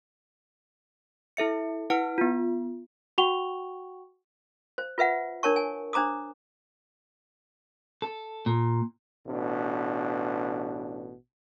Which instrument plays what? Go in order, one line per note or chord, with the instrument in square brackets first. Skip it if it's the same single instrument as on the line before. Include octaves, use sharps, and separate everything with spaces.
[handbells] E4 A4 E5 C#7
E4 B4 F#5 F6 D7
B3 F4
[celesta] F#4 F#5 G5 C#6 F7 G7
[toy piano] C5
F4 B4 E5 F#5
D4 A#4 C#5 A5 C#6
G#5
D4 C5 A#5 D6 D#6
[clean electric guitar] A4
A#2
[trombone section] A1 B2 D4